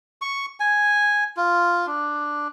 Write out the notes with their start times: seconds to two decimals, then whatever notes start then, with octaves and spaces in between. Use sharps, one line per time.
0.22 C#6
0.60 G#5
1.37 F4
1.86 D4